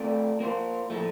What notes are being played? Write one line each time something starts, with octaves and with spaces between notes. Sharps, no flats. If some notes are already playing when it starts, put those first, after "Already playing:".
Already playing: A3 C4 F4 A4 D5
A#3 F4 C5
A2 F3 A3